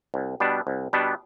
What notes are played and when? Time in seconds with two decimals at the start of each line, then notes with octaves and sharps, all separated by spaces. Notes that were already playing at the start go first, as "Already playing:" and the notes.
0.14 C2
0.40 B2 G3 B3 D4
0.67 C2
0.93 B2 G3 B3 D4